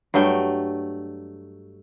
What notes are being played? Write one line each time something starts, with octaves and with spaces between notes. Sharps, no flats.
G2 F#3 A3 G5